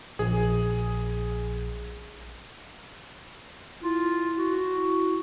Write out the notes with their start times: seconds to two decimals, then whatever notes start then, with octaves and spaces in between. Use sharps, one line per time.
0.19 A#1 G#4
3.82 E4 F4
4.38 F#4